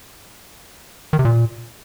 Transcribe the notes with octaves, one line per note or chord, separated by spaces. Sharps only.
D#3
C3
A#2